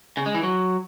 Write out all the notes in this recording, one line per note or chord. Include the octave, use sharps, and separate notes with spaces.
C#3
G#3
E3
F#3